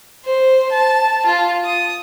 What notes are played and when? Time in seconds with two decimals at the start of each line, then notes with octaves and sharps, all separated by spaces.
0.25 C5
0.72 A5
1.26 F4
1.64 D#6